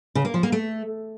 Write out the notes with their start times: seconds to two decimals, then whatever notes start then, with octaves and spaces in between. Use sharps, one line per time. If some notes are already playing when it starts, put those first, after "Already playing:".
0.15 C#3
0.25 A#3
0.34 F3
0.43 A#3
0.52 A3